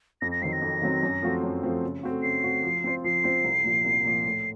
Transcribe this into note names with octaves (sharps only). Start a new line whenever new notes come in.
F2 A#6
A#6
D#3 F#3 C4 C7
A#6
F2
D#3 F#3 C4
F#2
F3 A3 C4 F#4
F#2
F3 A3 C4 F#4
C#3
A3 C4 F#4
C#3 C7
A3 C4 F#4
F3
C4 F4 C5
F3 C7
C4 F4 C5
C2
A#2 F3
C2
A#2 F3
A2